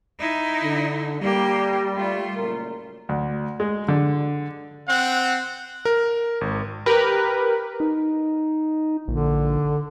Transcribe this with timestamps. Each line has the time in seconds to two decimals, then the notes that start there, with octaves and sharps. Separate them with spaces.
0.19 D#4 E4
0.63 D3
1.22 G3 A#3 G4
1.95 A3 F4
2.36 F#1 A#2 A#4
3.09 D2
3.60 G#3
3.88 D3
4.89 C4 F#5
5.85 A#4
6.41 G#1
6.86 G4 A#4 B4
7.80 D#4
9.08 A#1 D3